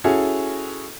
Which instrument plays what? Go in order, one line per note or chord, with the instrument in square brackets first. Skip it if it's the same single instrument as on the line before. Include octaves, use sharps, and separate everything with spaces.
[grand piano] C#4 E4 F#4 G#4 A4